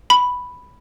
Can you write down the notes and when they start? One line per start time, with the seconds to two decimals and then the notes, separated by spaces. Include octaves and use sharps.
0.10 B5